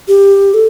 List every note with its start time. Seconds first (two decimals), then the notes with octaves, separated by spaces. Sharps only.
0.08 G4
0.54 A4